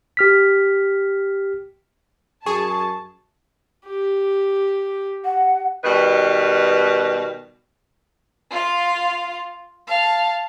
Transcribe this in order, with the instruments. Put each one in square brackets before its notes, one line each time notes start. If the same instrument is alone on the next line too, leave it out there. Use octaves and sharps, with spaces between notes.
[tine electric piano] G4 F6 B6
[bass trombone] F#2 [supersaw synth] G#4 [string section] A5 [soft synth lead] C#6
[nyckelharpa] G4
[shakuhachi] F#5
[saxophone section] B2 D#3 G3 B4
[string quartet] F4 F5
F5 A5